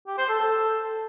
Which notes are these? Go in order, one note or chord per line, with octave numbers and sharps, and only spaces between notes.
G4
C5
A4
A4